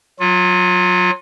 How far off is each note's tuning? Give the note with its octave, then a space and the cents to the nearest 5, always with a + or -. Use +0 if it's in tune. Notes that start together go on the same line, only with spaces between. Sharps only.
F#3 -15 F4 +20